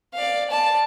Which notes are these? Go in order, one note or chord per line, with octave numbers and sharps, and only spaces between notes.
D5 F5
D5 A5